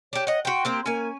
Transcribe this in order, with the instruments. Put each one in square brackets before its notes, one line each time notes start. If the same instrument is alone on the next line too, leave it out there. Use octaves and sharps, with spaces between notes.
[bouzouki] D4 G4 [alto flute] C#5
[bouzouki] D#5 F#5
[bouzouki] F#4 G5 [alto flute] C6
[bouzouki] A#3 C4 G4
[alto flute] A#3 [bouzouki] C#4 G#5